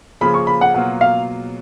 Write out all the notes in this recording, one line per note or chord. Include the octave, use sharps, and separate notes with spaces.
C#3 F3 A#3 F4 G#4 B5
C#6
B5
F#5
B2 F#3 A#3 F4 F#5
F5